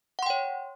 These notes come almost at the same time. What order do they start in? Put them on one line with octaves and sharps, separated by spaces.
F#5 C6 G5 C#5